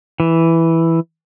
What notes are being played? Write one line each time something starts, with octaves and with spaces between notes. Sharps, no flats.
E3